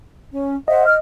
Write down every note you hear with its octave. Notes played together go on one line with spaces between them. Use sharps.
C#4
C5 D#5 E5 F#5
F6